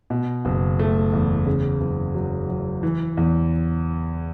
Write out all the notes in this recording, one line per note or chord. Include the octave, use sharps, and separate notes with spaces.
B2
F#1
A3
E2
C#3
F#1
F#3
F#2
E3
E2